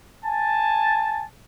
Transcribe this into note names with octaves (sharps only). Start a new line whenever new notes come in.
G#5 A5